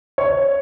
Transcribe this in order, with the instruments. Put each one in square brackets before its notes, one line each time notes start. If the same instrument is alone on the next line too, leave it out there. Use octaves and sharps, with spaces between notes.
[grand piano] C#5